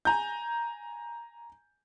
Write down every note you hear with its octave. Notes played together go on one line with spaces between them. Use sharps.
G#5 A#5 G6